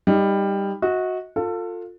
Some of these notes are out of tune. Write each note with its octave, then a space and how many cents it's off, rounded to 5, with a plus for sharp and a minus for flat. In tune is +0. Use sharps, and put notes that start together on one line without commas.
G3 +15 D#4 +0
F#4 -10 D#5 +35
F4 +20 A4 +25